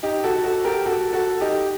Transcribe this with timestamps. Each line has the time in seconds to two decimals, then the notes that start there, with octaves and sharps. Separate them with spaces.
0.03 D#4 G4
0.24 F#4 A4
0.44 F#4 A4
0.65 G4 A#4
0.86 F#4 A4
1.13 F#4 A4
1.41 D#4 G4